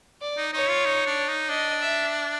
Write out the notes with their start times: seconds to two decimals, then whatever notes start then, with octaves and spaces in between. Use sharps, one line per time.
0.21 D5
0.37 D#4
0.53 D#4 C#5
0.69 F4
0.85 D#4
1.06 D4
1.28 D#4
1.49 D4 D#5
1.81 E5